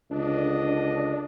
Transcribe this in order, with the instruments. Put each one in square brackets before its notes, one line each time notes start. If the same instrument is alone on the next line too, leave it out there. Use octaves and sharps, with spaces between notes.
[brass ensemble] C#2 D3 D#5 [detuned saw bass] D4